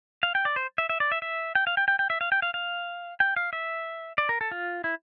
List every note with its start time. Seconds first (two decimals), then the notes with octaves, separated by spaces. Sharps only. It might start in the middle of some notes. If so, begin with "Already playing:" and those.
0.23 F5
0.35 G5
0.45 D5
0.56 C5
0.78 E5
0.89 E5
1.00 D5
1.12 E5
1.22 E5
1.55 G5
1.67 F5
1.77 G5
1.88 G5
1.99 G5
2.10 E5
2.21 F5
2.32 G5
2.42 F5
2.54 F5
3.20 G5
3.37 F5
3.53 E5
4.18 D5
4.29 A#4
4.41 A4
4.51 F4
4.84 E4